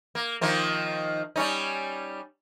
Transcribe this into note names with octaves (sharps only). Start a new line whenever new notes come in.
A#3
D#3 F3 A#3
G3 C#4 D#4